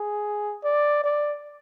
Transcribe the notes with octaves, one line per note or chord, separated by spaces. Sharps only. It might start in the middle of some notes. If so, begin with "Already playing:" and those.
Already playing: G#4
D5
D5